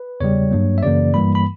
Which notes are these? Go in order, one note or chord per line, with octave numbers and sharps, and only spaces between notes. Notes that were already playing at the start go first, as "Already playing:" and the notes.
Already playing: B4
E2 C#3 G3 C#5
G2 F#3 A#3
E5
F#2 C#3 E3 A#3 D5
G2 E3 G3 A#3 B5
B5